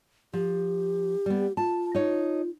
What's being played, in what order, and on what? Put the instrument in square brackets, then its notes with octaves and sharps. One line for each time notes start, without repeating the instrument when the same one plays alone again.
[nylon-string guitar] F3 [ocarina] G4
[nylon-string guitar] G3 B3
[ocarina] F4 [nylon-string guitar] A5
[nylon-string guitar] D#4 C#5